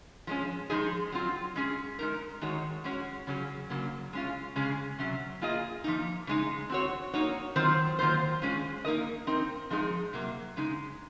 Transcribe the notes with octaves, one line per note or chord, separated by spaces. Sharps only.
F3 G#3 C#4
F3 G#3 D#4 G#4
F#3 C4 F4
G#3 C#4 G#4
G#3 D#4 A#4
D#3 G#3 D#4 F#4 C#5
G#3 C#4 F#4 C#5
C#3 F#3 C#4 G#4
C#3 F#3 A#3
G#3 C#4 F4
C#3 G#3 C#4 G#4
C3 F#3 C#4
A#3 F4 G#4 D#5
F3 A#3 D#4
C#3 G#3 D#4
C4 F#4 C#5
A#3 D#4 F#4 C#5
D#3 F#3 C4 F4 C5
D#3 F#3 A#3 F4 C5
G#3 C#4 F4
A#3 D#4 A#4 D#5
C4 D#4 A#4
F3 G#3 D#4 G#4
C3 F#3 A#3
C#3 G#3 D#4